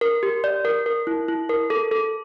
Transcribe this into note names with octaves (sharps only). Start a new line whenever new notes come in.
A#4
G4
D5
A#4
A#4
E4
E4
A#4
A4
A4